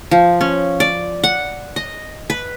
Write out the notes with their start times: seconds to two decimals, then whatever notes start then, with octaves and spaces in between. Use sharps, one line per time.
0.11 F3
0.41 C#4
0.80 D5
1.24 F#5
1.76 D#5
2.30 B4